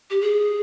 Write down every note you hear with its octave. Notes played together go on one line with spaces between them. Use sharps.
G4
G#4